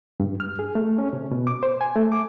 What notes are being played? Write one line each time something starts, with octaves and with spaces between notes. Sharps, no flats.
G2
F6
G#4
A3
C#4
C3
B2
D6
C5
G#5
A3
D6